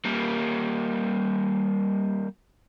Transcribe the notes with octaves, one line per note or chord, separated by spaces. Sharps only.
G3 A#3